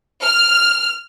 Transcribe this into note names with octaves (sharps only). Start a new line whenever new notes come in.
F6